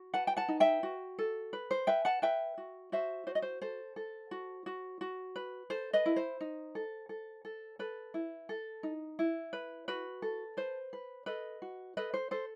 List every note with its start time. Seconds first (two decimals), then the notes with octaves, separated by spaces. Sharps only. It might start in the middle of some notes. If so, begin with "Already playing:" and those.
Already playing: F#4
0.14 B4 F#5 A5
0.27 G5
0.37 F#5 A5
0.48 D#4
0.60 E5 G5
0.83 F#4
1.19 A4
1.53 B4
1.71 C5
1.87 B4 E5 G5
2.05 F#5 A5
2.22 B4 E5 G5
2.58 F#4
2.92 F#4 C5 E5
3.27 F#4 C5
3.35 D#5
3.42 C5
3.61 A4 C5
3.96 A4
4.31 F#4
4.66 F#4
5.01 F#4
5.36 B4
5.70 A4 C5
5.93 B4 D#5
6.06 E4
6.16 C5
6.41 D#4
6.75 A4
7.09 A4
7.45 A4
7.79 A4 B4
8.14 E4
8.49 A4
8.83 D#4
9.19 E4
9.53 B4
9.88 F#4 B4
10.22 A4
10.57 B4 C5
10.93 B4
11.26 A4 B4 D#5
11.62 F#4
11.97 A4 B4 D#5
12.14 C5
12.31 A4 C5